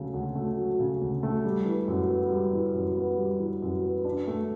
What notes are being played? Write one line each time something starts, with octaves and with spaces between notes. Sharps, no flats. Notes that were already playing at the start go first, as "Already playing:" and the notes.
Already playing: D2 C#3 F#3 A3
D2
A3
F#3
C#3
D2
A3
G3
E3
F#2
B3
G3
E3
F#2
B3
G3
E3
F#2
B3
D4
A3